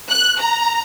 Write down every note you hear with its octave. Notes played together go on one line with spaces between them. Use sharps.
F#6
A#5